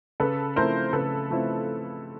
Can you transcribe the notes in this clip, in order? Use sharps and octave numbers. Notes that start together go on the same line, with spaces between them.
C#3 A4 B4
F3 A3 C4 E4 A#4 C5
C#3 A4 B4
F3 A3 C4 E4